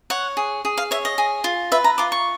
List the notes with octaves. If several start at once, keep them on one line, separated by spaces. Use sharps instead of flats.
C#5 F#5
G#4
G#4
F5
C#5 E5
D#5
G#4
F4
B4 E5
A#5
F4 D6
C#6